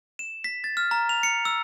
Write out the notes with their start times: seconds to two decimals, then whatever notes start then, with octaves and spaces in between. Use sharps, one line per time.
0.19 E7
0.44 B6
0.64 A6
0.77 F6
0.91 A#5
1.09 F7
1.23 C#7
1.45 E6